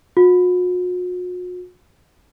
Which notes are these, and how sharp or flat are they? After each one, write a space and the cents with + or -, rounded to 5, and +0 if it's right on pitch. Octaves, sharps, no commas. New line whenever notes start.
F#4 -45